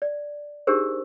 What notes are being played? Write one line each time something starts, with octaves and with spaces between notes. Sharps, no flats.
D5
D4 D#4 G4 G#4 A#4 C5